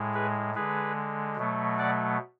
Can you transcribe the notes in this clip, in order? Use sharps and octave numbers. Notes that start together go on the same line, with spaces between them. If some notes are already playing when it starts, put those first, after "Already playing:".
Already playing: A2 G#3
G#4 B4
D3 G#3 G#4 B4
B2 F#3 A3
D5 F#5